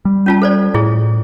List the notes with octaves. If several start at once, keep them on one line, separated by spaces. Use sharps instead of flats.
G3
C#4 F4 A5
A4 C5 D5
A2 E4 G#4